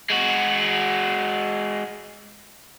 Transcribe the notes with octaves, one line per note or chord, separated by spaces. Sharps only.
G#3 F#4